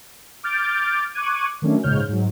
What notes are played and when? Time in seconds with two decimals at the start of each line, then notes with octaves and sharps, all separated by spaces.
0.43 D6 F6 G6 A6 D7
1.14 C#6 D6 F#6 G#6 D#7
1.62 D#3 F#3 A3 C#4 D4
1.83 A#1 G#2 C#3 C#5 F6 G6
2.09 G#2 F#3